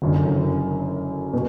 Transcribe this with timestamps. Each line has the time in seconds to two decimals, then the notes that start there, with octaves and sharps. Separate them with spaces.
0.02 F#1 F#2 D3
1.33 B2